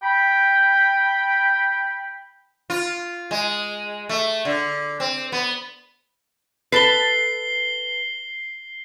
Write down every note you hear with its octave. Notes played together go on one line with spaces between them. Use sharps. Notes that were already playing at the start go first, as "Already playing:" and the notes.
G5 B5
F4
G#3
A3
D3
C4
B3
A4 B4 C7 G7